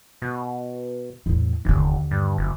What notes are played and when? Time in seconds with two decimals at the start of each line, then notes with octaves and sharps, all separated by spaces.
0.22 B2
1.26 E2 A2
1.65 F1 D#2 D3
2.11 G2
2.38 F#1